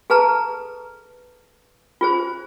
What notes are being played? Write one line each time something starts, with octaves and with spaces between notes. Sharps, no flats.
G#4 A4 B4 A5 A#5
F4 G#4 C5